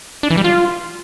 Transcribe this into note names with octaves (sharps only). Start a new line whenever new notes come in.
D4
E3
G3
F4